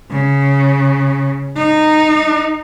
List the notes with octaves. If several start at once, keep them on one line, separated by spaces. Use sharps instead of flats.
C#3
D#4